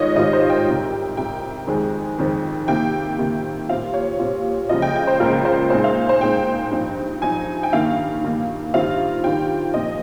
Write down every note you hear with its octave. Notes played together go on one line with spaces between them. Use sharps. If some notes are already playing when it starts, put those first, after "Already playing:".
Already playing: G#2 D#3 G3 C4 F4 C#5 D#5
G#2 D#3 G3 C4 F4 D#5
C5
G5
C2 C3 G3
C2 C3 G3 G5
F2 D#3 G#3 C4
F2 D#3 G#3 C4
C3 D#3 A#3 G5
C3 D#3 A#3
A#2 G3 C4 F4 F5
C#5
A#2 G3 C4 F4
C#2 C#3 F3 A#3 F4 D#5
G5
G5
C5
C#2 C#3 F3 A#3 F4 A#4
C5
A#2 G#3 C4 D#4 C5
F5
C5
A#2 G#3 C4 D#4 G5
G2 F3 C4 D#4
G2 F3 C4 D#4 G#5
G5
G2 D#3 A#3 F5
G2 D#3 A#3
G2 D#3 G3 C4 F4 F5
G2 D#3 G3 C4 F4 G5
A#2 F3 C4 D#5